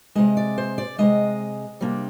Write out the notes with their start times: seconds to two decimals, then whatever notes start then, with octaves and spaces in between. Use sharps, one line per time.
0.15 C3 D#3 G#3 D#5
0.37 D5
0.58 C5
0.78 D5
0.98 C3 D#3 G#3 D#5
1.81 C3 G3 A#3 D4